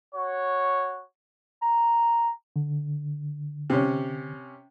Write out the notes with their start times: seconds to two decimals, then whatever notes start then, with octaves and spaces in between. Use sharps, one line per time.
0.14 F#4 C#5
1.62 A#5
2.56 D3
3.70 C3 C#4